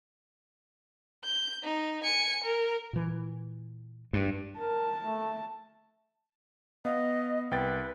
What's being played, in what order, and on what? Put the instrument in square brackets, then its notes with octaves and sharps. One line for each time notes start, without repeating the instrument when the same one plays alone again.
[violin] G6
D#4
G#5 C#7
A#4
[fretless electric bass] A#2 E3
[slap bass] G2
[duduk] A#4 [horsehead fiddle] A5
[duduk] A3
[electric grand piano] B3 F5 [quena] D#5
[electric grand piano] C2 G5 A6 [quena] B4